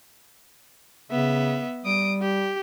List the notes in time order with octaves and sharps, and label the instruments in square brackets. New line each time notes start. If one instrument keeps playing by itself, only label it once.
[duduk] C#3 [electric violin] B3 E5
[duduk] G3 [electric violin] D#6 D7
[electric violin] G4